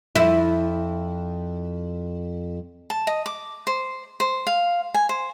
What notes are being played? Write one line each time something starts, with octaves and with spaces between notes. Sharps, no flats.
F2 E4
A5
D#5
D6
C5
C5
F5
G#5
C5